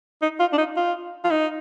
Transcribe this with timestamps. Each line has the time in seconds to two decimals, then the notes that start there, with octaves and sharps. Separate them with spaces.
0.22 D#4
0.40 F4
0.53 D4
0.58 D#4
0.76 F4
1.25 F4
1.31 D#4